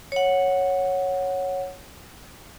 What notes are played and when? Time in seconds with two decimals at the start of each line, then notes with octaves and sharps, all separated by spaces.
0.12 C#5 F#5